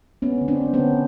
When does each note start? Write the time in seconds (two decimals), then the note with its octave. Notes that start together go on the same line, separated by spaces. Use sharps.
0.22 B3 C#4
0.41 D3
0.48 C4 D4
0.61 B3
0.73 B3 C#4
0.80 D3